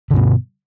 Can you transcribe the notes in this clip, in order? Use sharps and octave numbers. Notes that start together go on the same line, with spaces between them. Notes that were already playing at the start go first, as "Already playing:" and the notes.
G2 B2 D3